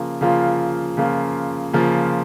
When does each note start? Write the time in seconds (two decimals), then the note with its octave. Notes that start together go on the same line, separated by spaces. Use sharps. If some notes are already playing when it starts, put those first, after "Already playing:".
Already playing: C#3 F3 A#3 F4
0.21 C#3 F3 A#3 F4
0.97 C#3 F3 A#3 F4
1.73 C#3 F3 A#3 F4